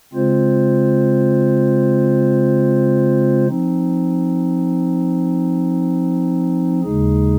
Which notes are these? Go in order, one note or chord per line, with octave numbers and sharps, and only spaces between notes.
C#3 G#3 C4 F4 C5
F3 C4 D#4
D#2 C#3 G#3 D#4 G#4